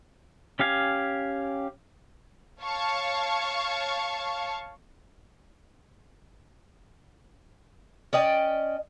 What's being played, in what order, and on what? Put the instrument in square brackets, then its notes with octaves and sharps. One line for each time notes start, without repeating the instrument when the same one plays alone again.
[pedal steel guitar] C#4 G4 F5 G#5
[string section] C#5 F5 A5 C#6
[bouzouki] C#4 D5 D#5 G5